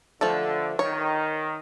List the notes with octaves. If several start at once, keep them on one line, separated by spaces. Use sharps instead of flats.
D3 F3 A3 A4
D#3 C#5